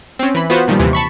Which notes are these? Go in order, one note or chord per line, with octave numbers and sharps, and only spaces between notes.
C4 C#4
E3 B5
B3 F4 F#4 B4 C5
A#2 D#3 F3 G3
D#2 C3 E3
A5 B5 C#6